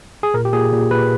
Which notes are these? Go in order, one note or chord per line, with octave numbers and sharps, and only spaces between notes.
G#4
A#2 A#4
G4
A#2 G#4
A#2
A#2 B4